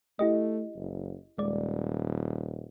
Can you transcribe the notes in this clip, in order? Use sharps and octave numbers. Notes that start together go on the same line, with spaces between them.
A3 E4 G4 D#5
F#1
D#1 G#3 D5